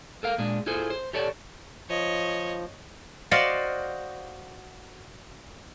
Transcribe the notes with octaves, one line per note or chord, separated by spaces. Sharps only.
A4 A#4 F5
A#2 G#3 D4
E4 F4 G#4 A4 C5
C5
G4 A4 C#5 D5 A5
F3 C#5 D#5
F#4 C5 D5 D#5 F5 F#5